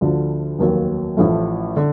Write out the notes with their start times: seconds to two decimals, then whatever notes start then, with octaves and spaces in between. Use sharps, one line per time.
0.01 D2 D3 F3
0.59 F1 D#2 D#3 F#3 A#3
1.17 A1 A2 F3 A3
1.77 D3